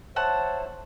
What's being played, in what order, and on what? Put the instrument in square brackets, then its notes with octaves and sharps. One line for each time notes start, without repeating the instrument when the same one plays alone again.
[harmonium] C5 C#5 E5 [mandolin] F#5 A5